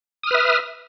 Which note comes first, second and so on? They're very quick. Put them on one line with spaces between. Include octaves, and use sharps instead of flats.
D#6 F6 B4 E5